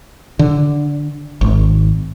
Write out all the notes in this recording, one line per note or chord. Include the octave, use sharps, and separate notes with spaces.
D3
G#1